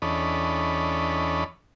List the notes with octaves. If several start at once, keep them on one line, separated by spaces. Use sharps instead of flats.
E2 C#4 D4 A4 D#5 B5